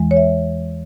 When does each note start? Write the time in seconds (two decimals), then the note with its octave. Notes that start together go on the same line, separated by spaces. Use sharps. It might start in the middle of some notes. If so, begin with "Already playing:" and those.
Already playing: E2 E3 G#3
0.11 C#5
0.17 E5